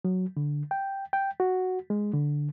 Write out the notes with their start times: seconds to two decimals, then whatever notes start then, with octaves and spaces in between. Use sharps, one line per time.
0.05 F#3
0.37 D3
0.71 G5
1.13 G5
1.40 F#4
1.90 G#3
2.13 D3